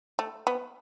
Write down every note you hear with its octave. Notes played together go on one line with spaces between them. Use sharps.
A3
B3